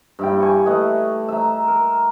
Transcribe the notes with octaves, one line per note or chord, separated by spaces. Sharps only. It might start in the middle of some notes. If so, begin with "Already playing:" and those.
G2 E4 G5
G#5 C#6
A3 B4 D#5
E5 A#5
A#4